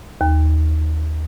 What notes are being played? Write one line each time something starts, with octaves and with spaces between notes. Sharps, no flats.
D#2